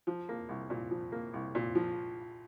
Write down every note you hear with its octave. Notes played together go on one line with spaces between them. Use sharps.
F3
A#3
C2
A#2
F3
A#3
C2
A#2
F3